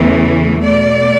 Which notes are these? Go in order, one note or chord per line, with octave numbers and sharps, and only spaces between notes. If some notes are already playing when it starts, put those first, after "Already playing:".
Already playing: E2 C#3 E3 A3
B2 A3 D5